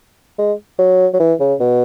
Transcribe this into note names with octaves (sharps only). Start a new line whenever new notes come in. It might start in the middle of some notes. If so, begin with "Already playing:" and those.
G#3
F#3
F#3
E3
C#3
B2